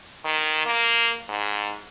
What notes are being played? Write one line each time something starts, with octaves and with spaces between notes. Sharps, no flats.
D#3
A#3
G#2